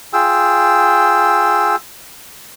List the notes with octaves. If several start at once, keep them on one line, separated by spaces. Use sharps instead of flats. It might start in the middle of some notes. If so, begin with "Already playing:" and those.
F4 G#4 G5 E6